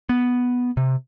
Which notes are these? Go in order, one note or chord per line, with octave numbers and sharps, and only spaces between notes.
B3
C3